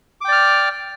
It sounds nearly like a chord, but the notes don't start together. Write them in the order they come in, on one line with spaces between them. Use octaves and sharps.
D6 G5 D5 F6